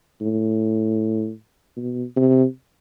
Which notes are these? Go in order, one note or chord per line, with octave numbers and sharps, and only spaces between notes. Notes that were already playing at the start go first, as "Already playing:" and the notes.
A2
B2
C3